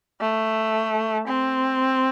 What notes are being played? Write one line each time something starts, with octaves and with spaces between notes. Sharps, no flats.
A3
C4